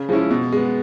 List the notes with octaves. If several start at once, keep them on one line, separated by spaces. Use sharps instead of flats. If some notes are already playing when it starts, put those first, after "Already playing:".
Already playing: C#3
F3 G#3 C#4 E4
B2
G#3 B3